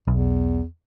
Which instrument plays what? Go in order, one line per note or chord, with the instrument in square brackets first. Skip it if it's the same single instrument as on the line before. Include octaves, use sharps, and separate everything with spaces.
[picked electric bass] B1 [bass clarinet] E2